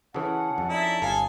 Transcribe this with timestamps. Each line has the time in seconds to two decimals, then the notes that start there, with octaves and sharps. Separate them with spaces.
0.14 C#3 E3 C#4 G#4 A4 F#5
0.58 F2 A4
0.70 D#4 E4 D5 E5
1.02 G1 A4 F5 G#5 A#5